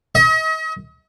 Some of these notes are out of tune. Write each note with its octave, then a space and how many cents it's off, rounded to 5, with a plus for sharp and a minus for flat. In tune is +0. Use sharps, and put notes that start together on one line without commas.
D#5 +40